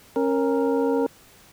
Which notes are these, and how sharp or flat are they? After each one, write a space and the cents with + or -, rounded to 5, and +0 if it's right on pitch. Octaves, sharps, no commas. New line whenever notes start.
C#4 -25 A#4 +0